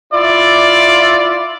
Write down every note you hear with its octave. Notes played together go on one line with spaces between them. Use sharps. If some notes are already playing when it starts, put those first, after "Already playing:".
E4 F4 D5 E5